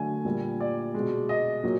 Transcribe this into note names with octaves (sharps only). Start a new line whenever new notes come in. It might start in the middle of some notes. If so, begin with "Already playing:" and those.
Already playing: D3 F#3 A3 G#5
A#2 G3
D5
B2 G#3
D#5
A#2 F#3